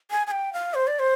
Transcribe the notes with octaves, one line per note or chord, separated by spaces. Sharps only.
G#5
G#5
G5
F5
C5
D5
C5